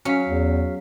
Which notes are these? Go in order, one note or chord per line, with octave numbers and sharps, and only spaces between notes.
F#3 C#4 F5 B6
E2